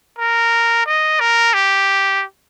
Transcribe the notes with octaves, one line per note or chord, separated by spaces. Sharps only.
A#4
D#5
A#4
G4